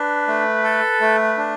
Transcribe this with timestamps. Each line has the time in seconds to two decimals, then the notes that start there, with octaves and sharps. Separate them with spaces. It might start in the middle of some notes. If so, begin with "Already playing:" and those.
Already playing: D4 B4
0.28 A3
0.64 A4
1.01 A3
1.37 D4